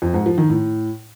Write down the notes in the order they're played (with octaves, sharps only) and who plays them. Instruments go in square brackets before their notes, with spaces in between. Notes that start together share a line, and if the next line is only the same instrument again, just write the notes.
[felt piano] F2
G#2
F3
D#3
A2